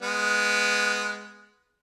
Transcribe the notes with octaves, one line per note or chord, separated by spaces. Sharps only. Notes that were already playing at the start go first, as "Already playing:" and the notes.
G#3 B3